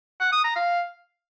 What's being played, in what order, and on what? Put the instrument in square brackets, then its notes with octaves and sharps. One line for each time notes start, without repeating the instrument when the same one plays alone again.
[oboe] F#5
D#6
A#5
F5